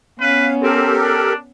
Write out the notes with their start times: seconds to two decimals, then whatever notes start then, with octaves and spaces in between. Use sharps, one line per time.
0.20 B3 C#4 B4 F5
0.63 C4 G4 A4 A#4
1.03 D4